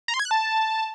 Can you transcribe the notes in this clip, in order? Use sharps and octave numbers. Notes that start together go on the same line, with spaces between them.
A#5
C6
G#6
F#6
A5